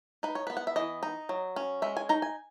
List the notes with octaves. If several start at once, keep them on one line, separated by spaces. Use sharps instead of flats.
D#4 B4
C#5
B3 B4
F#5
E5
E3 D#5
D#4
F#3
C#4
G#3 E5
G#5
D#4 A#5
G#5